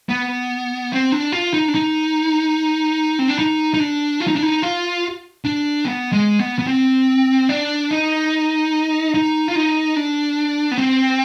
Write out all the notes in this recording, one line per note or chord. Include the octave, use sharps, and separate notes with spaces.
B3
C4
D4
F4
D#4
D4
D#4
C4
D4
D#4
D#4
D4
F4
D#4
D4
D#4
F4
D4
B3
G#3
B3
B3
C4
D4
D#4
D#4
F4
D#4
D4
B3
C4